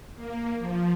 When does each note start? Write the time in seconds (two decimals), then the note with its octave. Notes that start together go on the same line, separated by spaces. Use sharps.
0.16 A#3
0.59 F3